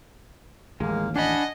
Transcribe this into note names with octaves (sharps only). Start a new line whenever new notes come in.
A1 D#2 G#3 A#3
D4 D#5 F#5 G#5 A5 B5